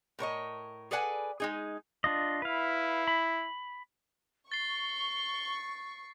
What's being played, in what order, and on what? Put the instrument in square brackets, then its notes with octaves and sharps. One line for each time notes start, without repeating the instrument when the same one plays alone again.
[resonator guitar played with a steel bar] A2 A#4 C#5 D#5
G#4 A4 B4 D5 F#5 G#5
G#3 D#4 G#4
[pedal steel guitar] D4 F4 D#5
[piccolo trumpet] E4 [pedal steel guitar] B4 F5
[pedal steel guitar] B5
[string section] C#6 [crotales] A6 C7 [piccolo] G7